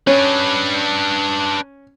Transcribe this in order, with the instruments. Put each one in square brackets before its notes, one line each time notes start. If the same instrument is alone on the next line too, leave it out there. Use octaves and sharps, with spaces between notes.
[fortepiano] C#4 [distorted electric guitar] D4 B4